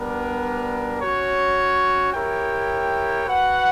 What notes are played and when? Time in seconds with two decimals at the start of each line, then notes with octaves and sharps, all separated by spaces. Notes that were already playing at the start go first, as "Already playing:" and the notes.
Already playing: G3 B3 D4 A#4
1.01 C#4 F#4 C#5
2.14 E4 G4 A#4 C#5 G5
3.26 F#4 B4 F#5